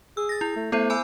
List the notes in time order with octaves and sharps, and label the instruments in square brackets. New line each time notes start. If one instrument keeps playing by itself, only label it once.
[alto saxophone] G#4 [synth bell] E6
[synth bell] A6 A#6
E4
[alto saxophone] A3
[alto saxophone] A3 [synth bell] B3 E4 C5
[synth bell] G#5 B5 E6